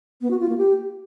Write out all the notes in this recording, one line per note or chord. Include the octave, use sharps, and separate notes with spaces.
B3
F#4
F4
A#3
G4